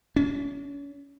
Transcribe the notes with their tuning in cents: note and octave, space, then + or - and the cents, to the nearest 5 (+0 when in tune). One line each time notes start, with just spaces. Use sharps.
C#4 +35